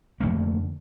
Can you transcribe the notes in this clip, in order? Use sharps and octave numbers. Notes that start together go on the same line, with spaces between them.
F2 D3 A3 A#3